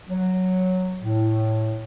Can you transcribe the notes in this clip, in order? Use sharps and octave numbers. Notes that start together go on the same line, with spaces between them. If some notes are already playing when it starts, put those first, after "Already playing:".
F#3
A2